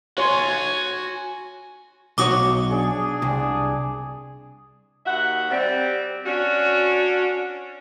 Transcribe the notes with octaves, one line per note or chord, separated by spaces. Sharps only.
F#4 C#5 G#5 C6
B1 F#4 C#5 D6 D#6
D4 G#4
C2
D#2 F#4 E5 F#5
G3 C4
C#4 D4 F#4